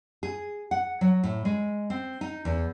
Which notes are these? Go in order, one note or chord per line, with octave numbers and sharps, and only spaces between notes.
G#4
F#5
F#3
A2
G#3
C4
D#4
E2